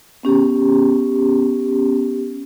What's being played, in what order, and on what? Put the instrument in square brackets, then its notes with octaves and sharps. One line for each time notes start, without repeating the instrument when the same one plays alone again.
[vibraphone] B3 C#4 G4